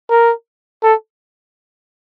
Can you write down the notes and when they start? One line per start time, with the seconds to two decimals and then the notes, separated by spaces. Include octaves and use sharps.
0.10 A#4
0.83 A4